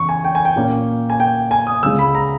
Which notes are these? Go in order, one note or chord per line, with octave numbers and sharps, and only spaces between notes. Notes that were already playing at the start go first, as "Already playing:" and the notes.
Already playing: E2 C#3 C#6
G#5
G5
G#5
G5
A#2 A#3 C#4
G#5
G5
G#5
D#6
C#2 C#3 G#3 E6
B5
A#5